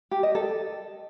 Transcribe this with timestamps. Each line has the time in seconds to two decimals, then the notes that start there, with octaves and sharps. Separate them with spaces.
0.11 G4
0.23 D#5
0.35 A4